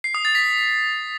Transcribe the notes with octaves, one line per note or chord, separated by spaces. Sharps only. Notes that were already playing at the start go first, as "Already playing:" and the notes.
C7
D#6
A6
B6